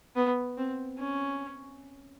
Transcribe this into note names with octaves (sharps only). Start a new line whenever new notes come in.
B3
C4
C#4